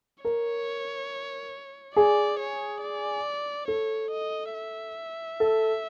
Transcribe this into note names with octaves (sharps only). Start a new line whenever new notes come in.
A#4 C#5
G#4 D5
C#5
D5
A4 C#5
D#5
E5
A4